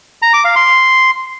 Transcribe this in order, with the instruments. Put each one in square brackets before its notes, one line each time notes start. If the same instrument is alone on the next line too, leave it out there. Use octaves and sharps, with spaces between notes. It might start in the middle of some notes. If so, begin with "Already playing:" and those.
[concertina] A#5
D6
F5
C6